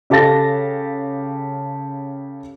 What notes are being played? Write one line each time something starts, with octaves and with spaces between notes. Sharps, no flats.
C#3 G4 A4 F5 A6 A#6